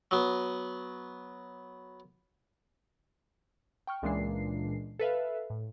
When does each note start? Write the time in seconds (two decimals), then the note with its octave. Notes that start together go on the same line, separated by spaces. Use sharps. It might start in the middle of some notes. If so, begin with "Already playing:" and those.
0.11 F#3 B3
3.87 G5 C#6 F6
4.02 C#2 A#2 E3 G#3 D4 C7
4.99 A4 B4 E5 F5
5.50 A2